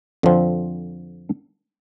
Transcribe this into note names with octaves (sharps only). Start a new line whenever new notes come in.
F2 D3 F3 C4